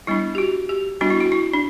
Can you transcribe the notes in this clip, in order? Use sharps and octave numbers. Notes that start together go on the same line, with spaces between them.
G3 B3 D4 E4
G4
F#4
G4
G3 B3 D4 F#4
E4
F#4
E4
D4